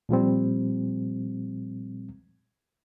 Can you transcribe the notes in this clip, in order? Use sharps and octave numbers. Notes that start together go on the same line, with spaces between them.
A#2 F3 G3 C4